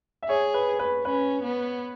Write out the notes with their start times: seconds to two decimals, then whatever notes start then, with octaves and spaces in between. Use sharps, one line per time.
0.23 E5
0.29 G#4 C#5
0.54 B4
0.79 B4
1.05 C#4 B4
1.43 B3